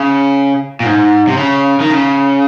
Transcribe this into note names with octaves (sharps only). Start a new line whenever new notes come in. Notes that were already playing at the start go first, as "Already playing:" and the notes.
Already playing: C#3
A#2
G#2
C3
C#3
D#3
C#3